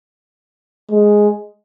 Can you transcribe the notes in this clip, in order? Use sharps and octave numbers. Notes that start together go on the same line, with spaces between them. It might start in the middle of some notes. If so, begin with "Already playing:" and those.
G#3